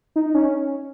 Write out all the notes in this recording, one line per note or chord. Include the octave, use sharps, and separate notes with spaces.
D#4
C#4